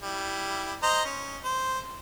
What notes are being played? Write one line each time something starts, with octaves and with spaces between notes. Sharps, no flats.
G3 E4
C5 D#5 A#5
C#4
C5